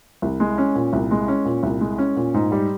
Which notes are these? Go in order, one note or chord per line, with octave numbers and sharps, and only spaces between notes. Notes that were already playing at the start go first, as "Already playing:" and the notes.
C2
G#3
C#4
A#2
C2
G#3
C#4
A#2
C2
G#3
C#4
A#2
G#2
G3